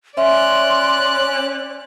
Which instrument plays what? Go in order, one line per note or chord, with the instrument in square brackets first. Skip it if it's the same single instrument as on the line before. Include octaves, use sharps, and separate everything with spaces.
[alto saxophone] C#4 [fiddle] D5 F#6 [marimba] E5 [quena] C6